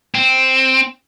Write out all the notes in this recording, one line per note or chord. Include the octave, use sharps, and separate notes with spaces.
C4